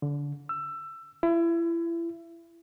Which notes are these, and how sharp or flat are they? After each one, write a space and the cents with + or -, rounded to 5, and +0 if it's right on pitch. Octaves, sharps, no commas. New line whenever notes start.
D3 -25
E6 +20
E4 +30